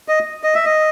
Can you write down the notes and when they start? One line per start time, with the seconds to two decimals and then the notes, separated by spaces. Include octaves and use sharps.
0.08 D#5
0.43 D#5
0.55 E5
0.65 D#5